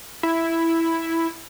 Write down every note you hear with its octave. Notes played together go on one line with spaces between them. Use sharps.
E4